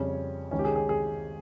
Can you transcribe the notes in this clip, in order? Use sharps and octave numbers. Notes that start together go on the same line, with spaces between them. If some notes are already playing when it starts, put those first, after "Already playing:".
Already playing: F2 C#3 G3 C#4
C#2 C3 D#3 C#4
G4
G#4
G#4
G#4